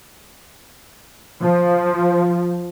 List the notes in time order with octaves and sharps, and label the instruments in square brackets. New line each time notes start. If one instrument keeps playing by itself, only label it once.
[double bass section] F3